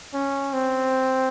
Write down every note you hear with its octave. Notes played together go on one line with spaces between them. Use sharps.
C#4
C4